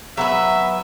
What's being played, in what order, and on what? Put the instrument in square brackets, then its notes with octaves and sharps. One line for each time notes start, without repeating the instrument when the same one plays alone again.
[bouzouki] F#3 B3 B4 [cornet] E5